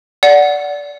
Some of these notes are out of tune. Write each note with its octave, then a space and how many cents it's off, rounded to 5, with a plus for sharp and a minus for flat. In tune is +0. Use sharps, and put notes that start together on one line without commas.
D5 -15 F#5 +0